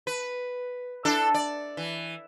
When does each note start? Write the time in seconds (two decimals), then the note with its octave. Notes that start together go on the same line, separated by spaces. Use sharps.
0.07 B4
1.05 D4 E4 A4
1.34 D5
1.77 E3